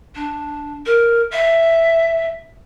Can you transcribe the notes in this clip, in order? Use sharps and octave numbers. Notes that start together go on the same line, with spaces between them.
D4
A#4
E5